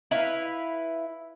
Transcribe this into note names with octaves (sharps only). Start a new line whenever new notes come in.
E4 B4 F5